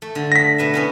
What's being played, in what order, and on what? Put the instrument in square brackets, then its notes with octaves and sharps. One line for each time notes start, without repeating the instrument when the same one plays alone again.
[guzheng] A3
D3
[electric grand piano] A#6 B6
[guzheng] B2 B4 E5
B3 C#4 E4